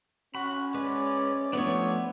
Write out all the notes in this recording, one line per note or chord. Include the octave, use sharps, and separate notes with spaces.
C#4 F#4 B5
G#3 B4 D5
F3 A3 B3 D4 C#5